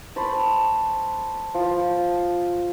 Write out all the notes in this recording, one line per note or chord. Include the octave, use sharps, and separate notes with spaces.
C5 A5 B5 C#6
F3